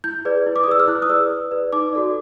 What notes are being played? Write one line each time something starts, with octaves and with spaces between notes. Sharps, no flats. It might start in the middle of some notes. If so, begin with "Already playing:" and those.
E4 G6
G#4 B4 D5
E4
D6
D#6
G#4 B4 D5 E6
F6
E4 F#6
D#6
G#4 B4 D5 E6
E4 D#6
G#4 B4 D5
D#4 D6
F#4 A4 D5